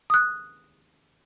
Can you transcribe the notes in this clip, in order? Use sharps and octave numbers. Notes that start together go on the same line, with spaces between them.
D#6 F#6